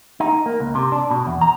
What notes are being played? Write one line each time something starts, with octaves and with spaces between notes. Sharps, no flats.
D#4
A#3
C#2
C3
D4
B2
E2
A#5